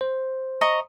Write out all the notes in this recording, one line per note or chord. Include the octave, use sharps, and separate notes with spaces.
C5
D#5 A#5 C#6